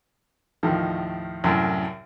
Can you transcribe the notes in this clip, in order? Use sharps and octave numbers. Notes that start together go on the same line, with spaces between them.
D#2 A2 D#3 F3
C2 F#2 A2